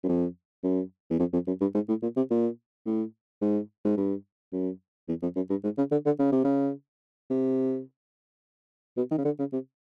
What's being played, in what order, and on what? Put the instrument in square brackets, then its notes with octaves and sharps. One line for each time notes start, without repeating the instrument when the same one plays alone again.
[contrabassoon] F#2
F2
F#2
E2
F2
F2
F#2
G2
G#2
A2
A#2
C3
A#2
A2
G#2
G#2
G2
F#2
E2
F2
F#2
G2
G#2
C#3
D3
D3
C#3
C3
C#3
C3
B2
D#3
C#3
D3
C#3
C3